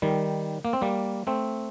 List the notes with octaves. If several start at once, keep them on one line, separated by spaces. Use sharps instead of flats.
D#3 G3
A#3
C4
G3 A#3
A3 C4